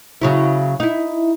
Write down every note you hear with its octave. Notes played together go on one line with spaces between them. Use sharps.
C#3 F#3 E4
D#4 E4